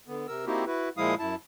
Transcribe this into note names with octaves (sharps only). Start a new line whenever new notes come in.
D3 B3
C3 A#4 E6
A#3 C4 D#4 E4 F#4 G4
E4 F#4 B4
A#2 F3 G#3 E4 F5 D#6
F#2 E4 A5